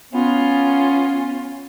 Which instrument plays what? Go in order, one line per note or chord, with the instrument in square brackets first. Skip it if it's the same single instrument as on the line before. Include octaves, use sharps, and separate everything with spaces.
[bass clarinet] B3 [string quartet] C#4 F4